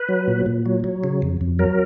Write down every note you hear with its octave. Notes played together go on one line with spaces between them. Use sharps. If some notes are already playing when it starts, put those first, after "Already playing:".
Already playing: B4
F#3
A#2
A#2
F#3
F#3
C#3
F2
F2
F#3 A#4